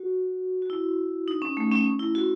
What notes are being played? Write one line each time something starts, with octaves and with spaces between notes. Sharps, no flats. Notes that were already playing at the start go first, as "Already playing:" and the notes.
Already playing: F#4
F#4
E4
D#4
C#4
A3
C#4
E4
F#4